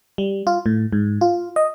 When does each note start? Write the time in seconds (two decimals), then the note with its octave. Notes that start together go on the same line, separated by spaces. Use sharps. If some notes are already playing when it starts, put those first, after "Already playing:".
0.18 G3
0.47 F4
0.66 A2
0.92 G#2
1.21 F4
1.56 D#5